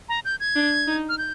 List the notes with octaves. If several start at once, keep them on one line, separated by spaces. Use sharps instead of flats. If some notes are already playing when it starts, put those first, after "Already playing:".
A#5
G6
G#6
D4
D#4
F6
G6